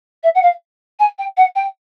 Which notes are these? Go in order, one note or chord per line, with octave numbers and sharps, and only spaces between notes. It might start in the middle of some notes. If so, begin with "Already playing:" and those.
E5
F#5
F5
G#5
G5
F#5
G5